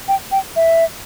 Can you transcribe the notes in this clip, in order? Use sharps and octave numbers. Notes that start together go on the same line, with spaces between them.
G5
G5
E5